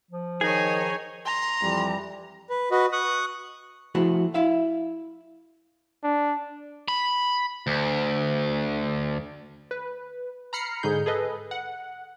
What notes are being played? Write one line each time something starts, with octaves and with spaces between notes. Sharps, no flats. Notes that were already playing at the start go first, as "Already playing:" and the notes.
F3
D#3 D#4 G#4 C#5 D#5 G#5
A#5 C6
F2 E3 G3
B4
F#4 B4 D#5
C#6 D#6 F#6
F3 A3 E4 F#4 G#4
E4 E5 F5
D4
B5
D2
B4
A#5 B5 F6 C7 C#7
G#2 D3 D#4 G#4 G6
G#4 A4 B4 D#5
F#5